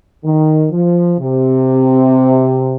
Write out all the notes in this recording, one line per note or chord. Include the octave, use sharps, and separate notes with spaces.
D#3
F3
C3